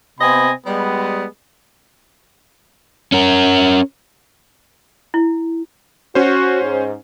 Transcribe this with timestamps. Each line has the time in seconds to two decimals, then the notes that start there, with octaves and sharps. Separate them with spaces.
0.20 C3 B3 C4 D#5 G#5 B5
0.66 G3 G#3 B3
3.12 C#4 A#4
5.14 E4
6.15 C#4 F#4 C5
6.62 G#2